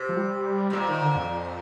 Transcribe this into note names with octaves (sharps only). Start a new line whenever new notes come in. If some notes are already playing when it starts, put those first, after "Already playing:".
Already playing: C3
F3
G3
C3
A#2 G3
D#3
D3
F2